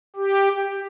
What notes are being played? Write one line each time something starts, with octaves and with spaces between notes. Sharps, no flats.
G4